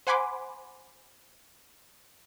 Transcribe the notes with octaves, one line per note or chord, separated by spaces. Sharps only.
C5 F#5 G#5 B5 C6 D6